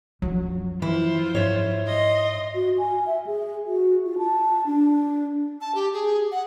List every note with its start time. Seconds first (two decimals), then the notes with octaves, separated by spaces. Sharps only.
0.22 F#2 F3 F#3
0.82 E3 E4 F4 C5
1.35 G#2 C#5 E5
1.86 D#5 C6
2.55 F#4
2.78 G#5
3.07 E5
3.27 G#4
3.66 F#4
4.05 F4
4.18 A5
4.66 D4
5.61 A5
5.75 G4
5.94 G#4
6.32 F#5